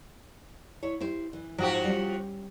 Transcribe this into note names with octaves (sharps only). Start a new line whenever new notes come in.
E4 C#5
E4 G4 C5
E3
G#2 F3 F#4 G4
G3 C#4